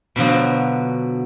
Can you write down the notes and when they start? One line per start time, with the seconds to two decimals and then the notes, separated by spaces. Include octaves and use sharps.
0.16 B2 D3 F3 F#3